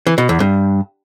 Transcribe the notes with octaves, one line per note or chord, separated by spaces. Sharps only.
E3
B2
E2
G2